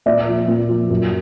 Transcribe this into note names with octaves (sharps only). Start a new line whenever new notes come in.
A#2 D5 E5
F3
A#2
F3
F#2